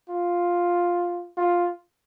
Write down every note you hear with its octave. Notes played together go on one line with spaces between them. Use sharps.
F4
F4